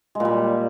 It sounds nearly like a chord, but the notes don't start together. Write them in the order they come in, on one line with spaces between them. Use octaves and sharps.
G#3 A#2 G3